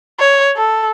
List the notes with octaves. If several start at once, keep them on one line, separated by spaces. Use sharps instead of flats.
C#5
A4